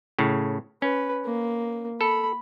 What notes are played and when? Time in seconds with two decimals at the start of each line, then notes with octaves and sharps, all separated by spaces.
0.19 A2 C#3
0.82 C#4 B4
1.25 A#3
2.01 A4 B5